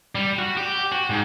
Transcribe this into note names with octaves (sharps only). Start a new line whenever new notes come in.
G3
F#4
G4
F#4
G#2